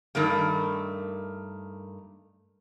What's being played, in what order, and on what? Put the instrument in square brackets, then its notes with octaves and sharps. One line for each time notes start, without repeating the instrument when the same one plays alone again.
[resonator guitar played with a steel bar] G2 D#3 A3 A#3